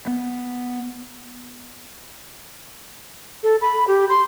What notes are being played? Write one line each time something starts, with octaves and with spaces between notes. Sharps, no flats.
B3
A4
B5
G4
C6